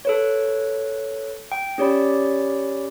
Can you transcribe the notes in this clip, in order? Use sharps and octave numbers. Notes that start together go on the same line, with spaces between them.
A4 B4 C#5
G5
C#4 G4 C#5 D5 B5